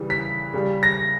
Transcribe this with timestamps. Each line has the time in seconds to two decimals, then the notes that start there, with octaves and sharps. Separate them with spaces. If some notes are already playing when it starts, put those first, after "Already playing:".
Already playing: C#3 E3 G3
0.10 B6
0.53 C#3 G3
0.83 A#6